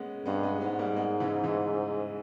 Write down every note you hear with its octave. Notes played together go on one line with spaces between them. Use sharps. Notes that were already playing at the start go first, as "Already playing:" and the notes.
Already playing: G#3 A#3 B3 C#4
G2 G#3 B3
G#3 B3
G#2 G#3 B3
G3 A#3
G#3 B3
C#3 E3
C#3 E3